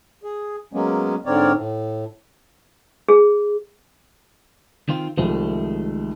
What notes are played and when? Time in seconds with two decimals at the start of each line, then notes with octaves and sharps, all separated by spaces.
0.23 G#4
0.73 F#3 G#3 A#3 B3 C#4
1.26 G#2 D3 C4 A#4 C#5 D5
1.54 A2
3.09 G#4
4.89 D#3 C4 F4
5.17 C2 D#3 F3 G#3 A3